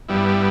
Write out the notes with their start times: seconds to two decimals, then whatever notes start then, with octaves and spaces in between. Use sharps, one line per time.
0.09 G2 G3 B3 E4